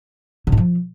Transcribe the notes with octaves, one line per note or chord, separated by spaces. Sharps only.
C#3
G#2
F3